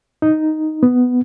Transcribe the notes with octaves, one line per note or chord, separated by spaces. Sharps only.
D#4
B3